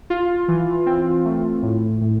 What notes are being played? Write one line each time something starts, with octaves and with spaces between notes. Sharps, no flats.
F4
E3
C4
A3
A2
A2